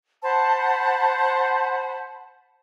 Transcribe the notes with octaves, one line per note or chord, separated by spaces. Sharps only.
C5 F#5 A5 B5